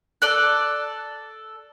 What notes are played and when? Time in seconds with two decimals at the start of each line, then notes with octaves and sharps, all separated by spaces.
0.22 A4 D5 F#6